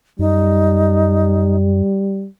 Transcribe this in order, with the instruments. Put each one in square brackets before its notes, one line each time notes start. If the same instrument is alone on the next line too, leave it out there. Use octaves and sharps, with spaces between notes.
[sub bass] F#2 [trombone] G3 [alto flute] D#4